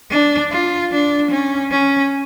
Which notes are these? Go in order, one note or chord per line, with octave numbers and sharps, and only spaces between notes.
D4
F4
D4
C#4
C#4